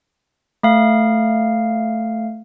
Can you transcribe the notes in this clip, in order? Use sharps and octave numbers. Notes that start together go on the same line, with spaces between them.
A3 F5